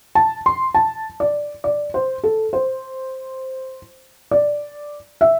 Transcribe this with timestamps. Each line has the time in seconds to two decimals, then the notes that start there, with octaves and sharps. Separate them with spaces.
0.15 A5
0.46 C6
0.75 A5
1.20 D5
1.64 D5
1.94 C5
2.24 A4
2.53 C5
4.31 D5
5.21 E5